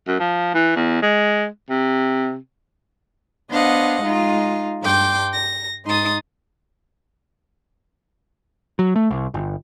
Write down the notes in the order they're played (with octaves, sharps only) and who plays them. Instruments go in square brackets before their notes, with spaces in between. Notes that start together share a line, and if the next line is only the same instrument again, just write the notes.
[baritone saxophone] F#2
F3
E3
E2
G#3
C3
[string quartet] B3 D4 C5 D#5 F5 F#5
G#3 D#4 F4
G2 G5 C6 D6
A#6
G#2 D#4 C6 D#6 A6
[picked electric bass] F#3
A3
C2
G1